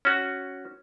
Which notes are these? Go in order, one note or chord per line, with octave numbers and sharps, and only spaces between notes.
C#4 F#4